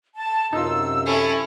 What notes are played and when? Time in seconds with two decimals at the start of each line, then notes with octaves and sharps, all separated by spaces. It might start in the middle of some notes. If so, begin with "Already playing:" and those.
0.15 A5
0.53 F#2 C3 D#4 F4 E6
1.05 C#4 E4 A4